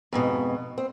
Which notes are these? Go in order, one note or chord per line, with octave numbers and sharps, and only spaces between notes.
F2 G#2 B2
C4